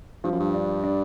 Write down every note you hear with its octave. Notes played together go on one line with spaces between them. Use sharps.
G2 F3
F#2
G2
D4
D4